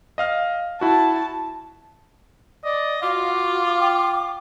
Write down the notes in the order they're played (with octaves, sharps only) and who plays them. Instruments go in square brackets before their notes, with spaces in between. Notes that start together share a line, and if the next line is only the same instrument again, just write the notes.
[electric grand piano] D#5 F5 F6
[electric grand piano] E4 F#4 [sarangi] A5
[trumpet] D5 [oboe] D#5
[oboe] F4 [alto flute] F#4 [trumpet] F5 [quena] D6
[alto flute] G5